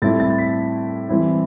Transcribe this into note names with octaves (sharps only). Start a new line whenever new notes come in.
A2 G3 C4 E4 A6
A6
A6
B6
E3 G3 C4 E4